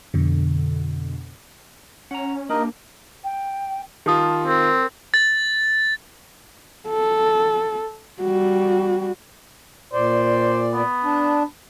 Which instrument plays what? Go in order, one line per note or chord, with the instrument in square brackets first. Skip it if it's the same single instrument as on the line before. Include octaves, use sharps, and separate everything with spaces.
[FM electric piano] F2 B2 D3
[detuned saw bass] C#4 [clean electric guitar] F#5 A#5
[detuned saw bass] A#3 [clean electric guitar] D4 G4 [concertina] D#4 A#4 D#5
[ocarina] G5
[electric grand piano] D#3 F4 [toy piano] G4 D#6 [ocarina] A5
[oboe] C4 [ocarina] A#4
[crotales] A6
[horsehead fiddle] A4
G3 F#4
[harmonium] A#2 D5 [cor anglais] C5
[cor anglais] B3
[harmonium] D4